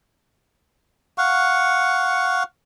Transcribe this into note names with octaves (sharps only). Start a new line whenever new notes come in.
F5 F#5 C#6